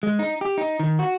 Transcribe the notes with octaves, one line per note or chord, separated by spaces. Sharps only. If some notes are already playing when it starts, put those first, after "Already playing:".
G#3
D#4
G4
D#4
D#3
F#4